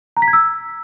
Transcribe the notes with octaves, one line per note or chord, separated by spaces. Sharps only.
A#5
B6
G#6
E6